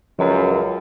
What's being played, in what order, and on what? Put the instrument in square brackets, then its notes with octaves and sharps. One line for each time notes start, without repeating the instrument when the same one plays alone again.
[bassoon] C#2 [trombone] F#2 [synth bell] F3 D#5 A#5